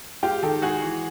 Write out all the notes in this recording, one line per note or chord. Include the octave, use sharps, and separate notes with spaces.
G#3 F4 G4
D#3 G4 A4
G#3 F#4 G#4
E3